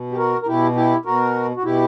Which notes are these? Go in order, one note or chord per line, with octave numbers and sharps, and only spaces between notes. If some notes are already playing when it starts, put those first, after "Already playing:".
Already playing: B2
G4
F#4 A#4
A#4
B2 E4 G4
E4 G4
B2 F#4 A#4
F#4
B2 E4 G4